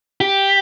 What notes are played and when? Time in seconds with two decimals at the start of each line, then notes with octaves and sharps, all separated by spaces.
0.21 G4